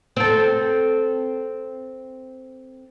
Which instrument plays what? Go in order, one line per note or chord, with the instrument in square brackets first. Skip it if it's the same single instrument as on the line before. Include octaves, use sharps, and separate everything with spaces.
[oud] C4 A4